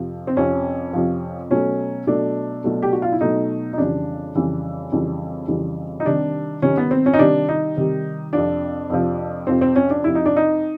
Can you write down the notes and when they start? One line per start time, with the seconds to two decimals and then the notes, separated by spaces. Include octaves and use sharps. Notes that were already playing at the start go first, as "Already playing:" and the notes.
Already playing: F2 C3 F3
0.27 C4
0.36 F2 C3 F3 C#4
0.93 F2 C3 F3
1.50 B2 F#3 A3 C#4
2.07 B2 F#3 A3 D4
2.64 B2 F#3 A3
2.82 G4
2.93 F#4
3.02 F4
3.12 E4
3.21 B2 F#3 A3 D#4
3.73 D#4
3.78 F2 C#3 E3 G3 D4
4.35 F2 C#3 E3 G3
4.92 F2 C#3 E3 G3
5.48 F2 C#3 E3 G3
6.00 D#4
6.06 C3 D#3 G3 D4
6.62 C3 D#3 G3 C#4
6.77 B3
6.91 C4
7.06 C#4
7.13 D#4
7.19 C3 D#3 G3 D4
7.49 D#4
7.76 C3 D#3 G3
8.33 F2 C3 F3 D4
8.90 F2 C3 F3
9.47 F2 C3 F3 C4
9.61 C4
9.76 C#4
9.90 D4
10.04 F2 C3 F3 E4
10.15 D#4
10.25 D4
10.36 D#4